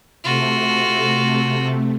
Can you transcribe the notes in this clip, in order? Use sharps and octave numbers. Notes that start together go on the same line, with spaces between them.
C3 A3 F4 F#4